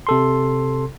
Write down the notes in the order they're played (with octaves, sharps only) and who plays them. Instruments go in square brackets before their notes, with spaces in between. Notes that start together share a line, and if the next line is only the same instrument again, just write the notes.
[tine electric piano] C3 A4 C6